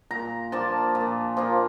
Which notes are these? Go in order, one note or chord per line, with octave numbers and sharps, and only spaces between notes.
A#2 A#5
F3 A#3 D4 A5
A#2
F3 A#3 D4